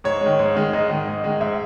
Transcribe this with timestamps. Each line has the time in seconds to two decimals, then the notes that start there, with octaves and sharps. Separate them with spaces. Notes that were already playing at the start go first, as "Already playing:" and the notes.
0.04 G#2 C#5
0.21 G#3
0.26 D#3
0.39 G#2
0.55 D#3 G#3
0.73 G#2 D#5
0.89 D#3 G#3
1.07 G#2
1.24 D#3 G#3
1.41 G#2 E5